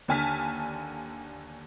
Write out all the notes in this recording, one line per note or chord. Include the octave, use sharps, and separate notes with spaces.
D#2 D3 G#5 A5 F6 B6